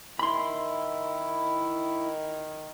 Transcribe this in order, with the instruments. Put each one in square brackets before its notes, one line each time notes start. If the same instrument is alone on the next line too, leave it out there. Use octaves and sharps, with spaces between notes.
[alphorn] D#3 [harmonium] E4 [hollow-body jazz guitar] B5 C6